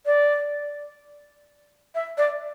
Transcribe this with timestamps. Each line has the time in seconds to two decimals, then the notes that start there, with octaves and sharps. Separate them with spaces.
0.06 D5
1.95 E5
2.18 D5